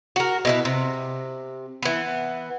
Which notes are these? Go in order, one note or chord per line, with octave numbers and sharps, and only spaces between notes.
F#4 A#4
B2 E4 B4
C3
E3 B3